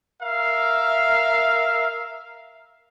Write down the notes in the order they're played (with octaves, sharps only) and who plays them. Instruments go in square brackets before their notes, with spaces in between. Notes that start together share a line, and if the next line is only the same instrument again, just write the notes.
[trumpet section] A#4 E5 F5